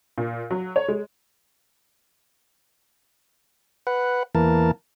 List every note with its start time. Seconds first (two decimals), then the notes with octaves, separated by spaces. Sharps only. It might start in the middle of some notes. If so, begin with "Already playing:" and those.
0.18 A#2
0.51 F#3
0.76 C#5
0.88 G#3
3.87 B4 F#5
4.35 E2 E3 A#3 A#4 A5